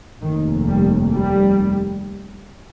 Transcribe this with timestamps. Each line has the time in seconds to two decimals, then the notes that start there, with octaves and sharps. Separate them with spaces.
0.21 F1 D#2 D#3
0.67 G3
1.13 G3